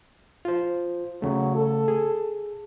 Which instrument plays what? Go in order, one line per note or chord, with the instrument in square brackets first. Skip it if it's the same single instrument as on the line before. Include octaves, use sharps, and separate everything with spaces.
[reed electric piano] F4 C5
[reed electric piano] C#3 A3 [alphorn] F#3
[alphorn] A4
[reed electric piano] G#4